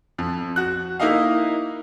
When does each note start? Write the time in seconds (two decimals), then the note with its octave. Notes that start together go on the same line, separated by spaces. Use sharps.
0.18 F2
0.56 F#4 F#6
0.99 A#3 D#4 E4 D#5 F5